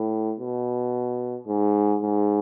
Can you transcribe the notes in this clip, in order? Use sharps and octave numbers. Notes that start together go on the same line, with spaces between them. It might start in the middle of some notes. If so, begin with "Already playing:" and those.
Already playing: A2
B2
G#2
G#2